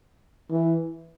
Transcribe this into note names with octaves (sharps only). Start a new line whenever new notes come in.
E3